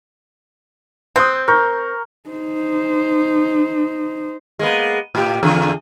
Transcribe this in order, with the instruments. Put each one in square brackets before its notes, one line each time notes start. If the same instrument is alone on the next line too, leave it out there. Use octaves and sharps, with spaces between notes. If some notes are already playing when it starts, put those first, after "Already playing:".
[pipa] C4 [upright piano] D#6 F#6 G6
[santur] A#4 [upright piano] C#6 G6
[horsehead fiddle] D#4 C5
[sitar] G#3 A#3 B3
A2 G4
E2 D3 G#4